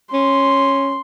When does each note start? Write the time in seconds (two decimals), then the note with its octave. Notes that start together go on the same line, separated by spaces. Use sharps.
0.13 C#4 C6